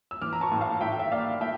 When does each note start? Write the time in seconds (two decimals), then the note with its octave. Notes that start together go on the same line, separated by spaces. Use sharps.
0.11 E6
0.22 E3 D6 F6
0.33 A#5
0.41 A5 C#6
0.52 A2
0.61 F5 A5
0.81 A2 E5 G5
0.99 E5
1.12 A#3 D5 F5
1.40 A3 E5 G5